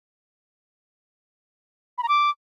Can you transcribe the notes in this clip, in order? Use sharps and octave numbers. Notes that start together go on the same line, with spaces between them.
B5
A#5
D6